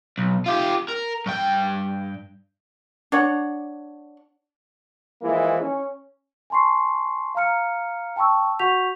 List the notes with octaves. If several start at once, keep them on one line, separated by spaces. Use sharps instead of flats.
B1
F4 G4
A#4
G2 G5
D4 C#5 F#5
E3 F3 G#3 A#3 E4
C#4
G#5 A5 C6 C#6 C7
F5 A#5 F6 C#7
G5 A5 B5 C#6 E6
F#4 F#5 C#6 G6 B6 F7